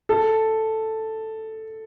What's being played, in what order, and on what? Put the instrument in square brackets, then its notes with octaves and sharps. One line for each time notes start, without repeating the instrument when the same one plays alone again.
[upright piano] A4